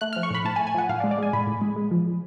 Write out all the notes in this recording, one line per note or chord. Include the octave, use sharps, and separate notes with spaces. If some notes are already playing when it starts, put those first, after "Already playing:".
A3 F#6
F3 F6
C#6
A2 B5
A2 A5
G#5
A3
G#5
F3 F#5
A2 F5
D5
G#3
D5
G#3 G#5
A2 B5
A2
G#3
G#3
F3